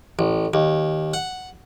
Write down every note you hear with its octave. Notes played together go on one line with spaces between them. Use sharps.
A1
D#2
F#5